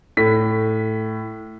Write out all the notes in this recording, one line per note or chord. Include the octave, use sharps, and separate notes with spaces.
A2 B6